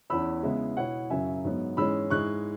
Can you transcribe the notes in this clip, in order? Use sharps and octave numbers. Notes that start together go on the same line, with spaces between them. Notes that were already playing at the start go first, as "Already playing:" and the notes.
E2 E3 C#4 E4 B5 E6
C#3 G#3 B3 E4 E5
B2 B3 E4 C#5 F#5
F#2 C#3 F#3 E5 G#5
G#2 F#3 B3
G#2 E3 G#3 C#4 B5 E6
G#2 G#3 E4 C#6 F#6